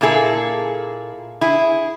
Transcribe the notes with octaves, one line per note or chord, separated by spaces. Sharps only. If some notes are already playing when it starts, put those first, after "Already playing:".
A#2 A#3 E4 G#4 A4
E4 G#4